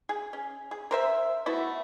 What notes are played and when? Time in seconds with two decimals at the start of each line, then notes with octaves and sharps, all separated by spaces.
0.09 G#4
0.33 C#4
0.71 G#4
0.91 A#4 C5 E5
1.46 A3 B3 E4 F#4